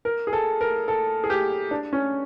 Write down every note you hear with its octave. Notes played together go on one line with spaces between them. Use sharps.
A#4
G#4
A4
A#4
A4
G#4
G4
D4
C#4